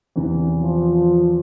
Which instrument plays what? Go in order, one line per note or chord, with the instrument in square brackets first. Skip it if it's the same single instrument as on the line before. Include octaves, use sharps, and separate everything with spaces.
[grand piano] E2 C3 E3
[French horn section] F3